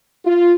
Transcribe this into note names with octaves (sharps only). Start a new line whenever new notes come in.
F4